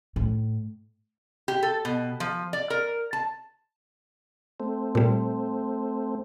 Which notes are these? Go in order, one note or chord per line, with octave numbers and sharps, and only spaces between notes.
A2
G4
A4
B2
F3
D5
A#4
A5
A3 C4
A#2 G3